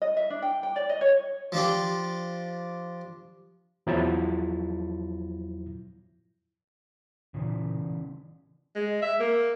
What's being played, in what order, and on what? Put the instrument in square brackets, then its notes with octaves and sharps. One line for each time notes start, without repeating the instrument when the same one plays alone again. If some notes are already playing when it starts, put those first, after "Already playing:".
[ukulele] D#5
E5
D4
G5
G5
D5
D#5
C#5
[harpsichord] F3 D4 G4
[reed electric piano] E2 F3 F#3 E4 F4 A6
[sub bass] A#2 [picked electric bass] C#3 E3
[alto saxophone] G#3
E5
A#3